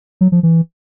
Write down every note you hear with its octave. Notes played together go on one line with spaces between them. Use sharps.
F#3
F3
E3